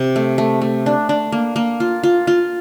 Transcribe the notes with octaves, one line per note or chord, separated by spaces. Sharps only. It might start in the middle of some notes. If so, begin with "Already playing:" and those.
Already playing: C3
A3
A3
A3
D4
D4
A#3
A#3
F4
F4
F4